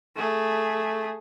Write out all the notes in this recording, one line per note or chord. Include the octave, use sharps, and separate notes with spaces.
A3 G#4